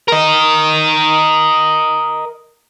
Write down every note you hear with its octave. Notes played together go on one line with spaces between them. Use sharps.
A#4 D#5